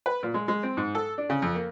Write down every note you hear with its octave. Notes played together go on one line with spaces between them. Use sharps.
B4
A#2
G#3
G#3
C4
G#2
A4
D4
C#3
F2
A#3